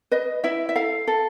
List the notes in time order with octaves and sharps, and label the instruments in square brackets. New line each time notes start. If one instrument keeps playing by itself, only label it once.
[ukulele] B4 D#5
E4 E5
E5
A4 F5
A4